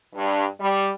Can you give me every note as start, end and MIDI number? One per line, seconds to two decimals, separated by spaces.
0.15 0.45 43
0.60 0.89 55